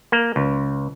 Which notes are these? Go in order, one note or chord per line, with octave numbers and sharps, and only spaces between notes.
A#3
C#2